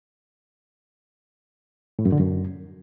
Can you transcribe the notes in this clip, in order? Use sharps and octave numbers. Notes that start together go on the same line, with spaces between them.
A2
F#2
D3
F#2